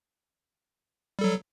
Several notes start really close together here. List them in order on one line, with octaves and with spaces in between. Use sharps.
G3 A4 F#3